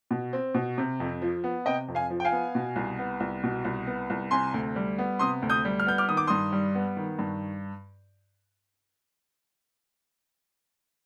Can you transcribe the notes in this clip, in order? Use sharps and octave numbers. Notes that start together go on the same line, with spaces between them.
B2
C4
B2
C3
F2
F3
B3
C3 D#5 G5
F2
F5 G#5
F3
G5
F5 G#5
B3
B2
C2
B3
C2
B2
C2
B3
C2
C3 G#5 C6
D2
G3
B3
C3 C6 D#6
D2
D#6 G6
G3
F6
B3 G6
D6 F6
D#3 D#6
D6
G2 C6 D#6
G3
B3
D#3
G2